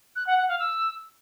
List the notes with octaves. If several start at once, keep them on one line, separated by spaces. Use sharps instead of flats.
F#6
F#5
F#5
F5
E6